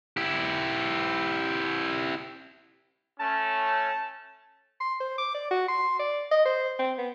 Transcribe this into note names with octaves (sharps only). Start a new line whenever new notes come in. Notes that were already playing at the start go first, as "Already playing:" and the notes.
E4 G4
A3 C#4 A5
C6
C5
D6
D5
F#4
C6
D5
D#5
C5
C4
B3